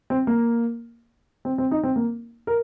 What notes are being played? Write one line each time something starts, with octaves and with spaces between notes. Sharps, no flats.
C4
A#3
C4
C4
D#4
C4
A#3
A#4